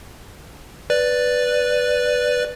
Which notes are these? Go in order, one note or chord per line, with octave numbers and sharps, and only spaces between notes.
B4 D5